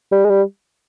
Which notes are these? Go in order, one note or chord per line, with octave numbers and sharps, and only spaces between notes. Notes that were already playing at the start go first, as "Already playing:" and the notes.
G3
G#3
G3